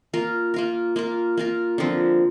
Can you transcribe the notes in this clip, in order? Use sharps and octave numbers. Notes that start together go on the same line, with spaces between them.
A#3 F4 A#4
A#3 F4 A#4
A#3 F4 A#4
A#3 F4 A#4
D3 F3 C4